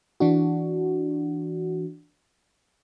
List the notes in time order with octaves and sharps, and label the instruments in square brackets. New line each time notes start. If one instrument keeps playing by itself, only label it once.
[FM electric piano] E3 D4 F#4